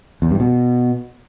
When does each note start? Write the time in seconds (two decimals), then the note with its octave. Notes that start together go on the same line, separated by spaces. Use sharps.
0.22 E2
0.31 G2
0.40 B2